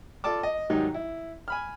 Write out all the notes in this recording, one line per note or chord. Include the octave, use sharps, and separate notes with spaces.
F4 A4 D5 A5 D6
D#5
G#2 D#3 F#3 G3 D#4
E4
G#5 B5 F6